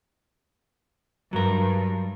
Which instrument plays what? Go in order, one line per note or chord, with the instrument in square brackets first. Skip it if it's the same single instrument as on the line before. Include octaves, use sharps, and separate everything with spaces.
[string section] G2 [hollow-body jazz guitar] F#3 A#4